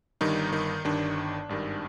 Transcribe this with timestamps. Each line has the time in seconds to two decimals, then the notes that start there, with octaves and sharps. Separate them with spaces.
0.21 G1 G2 D#3 D#4
0.53 D#3 D#4
0.84 G1 G2 D#3 D4
1.49 G#1 G2 D#3